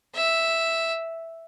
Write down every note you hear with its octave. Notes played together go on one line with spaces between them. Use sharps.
E5